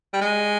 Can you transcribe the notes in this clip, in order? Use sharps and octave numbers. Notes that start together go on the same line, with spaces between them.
G3
G#3